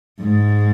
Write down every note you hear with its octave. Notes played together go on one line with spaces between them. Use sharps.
G#2